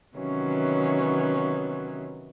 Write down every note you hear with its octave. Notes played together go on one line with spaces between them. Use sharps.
C3 D#3 E3 F#3 B3 C#4